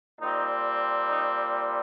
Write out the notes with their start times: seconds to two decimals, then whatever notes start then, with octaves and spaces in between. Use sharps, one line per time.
0.20 A#2 G3 C4 D#4
1.09 D#4